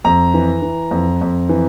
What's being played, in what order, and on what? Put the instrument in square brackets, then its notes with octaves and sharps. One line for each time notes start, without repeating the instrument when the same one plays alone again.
[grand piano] F2 A#5
E3
E3
F2
F2
E3